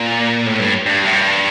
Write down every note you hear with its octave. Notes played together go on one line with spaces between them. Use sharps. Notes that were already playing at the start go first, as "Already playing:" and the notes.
Already playing: A#2
A2
G2
G2
A2
G2